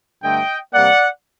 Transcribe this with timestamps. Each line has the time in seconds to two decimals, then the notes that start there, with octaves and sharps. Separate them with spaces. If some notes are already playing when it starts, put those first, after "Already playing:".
0.23 G2 D3 A3 D#5 G5
0.73 C3 G3 A#3 D5 F#5